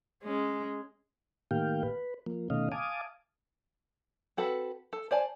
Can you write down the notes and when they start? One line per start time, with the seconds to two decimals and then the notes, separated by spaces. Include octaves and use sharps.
0.23 G#3 C#4
1.51 A2 D#3 A#3 G4 F5 G5
1.83 B4
2.26 F3 A#3
2.50 B2 D#3 A3 C#4 D#5 F5
2.72 F5 G#5 A5 D6 D#6
4.37 C4 F#4 A4 B4
4.93 A4
5.11 C5 D5 G#5 A5